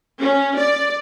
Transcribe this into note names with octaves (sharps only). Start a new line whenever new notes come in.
C#4
D5